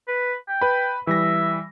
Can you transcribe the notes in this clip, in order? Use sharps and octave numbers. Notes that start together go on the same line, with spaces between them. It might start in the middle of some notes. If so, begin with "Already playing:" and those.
B4
G5
B4 B5
E3 G3 E5 A#6